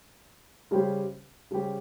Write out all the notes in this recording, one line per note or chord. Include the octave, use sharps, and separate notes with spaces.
C#3 G3 C#4 G4 C5
C#3 G3 C#4 G4 C5